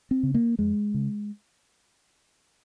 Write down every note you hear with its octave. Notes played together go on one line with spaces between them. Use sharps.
C4
C#3
A#3
F2 G#3
C#3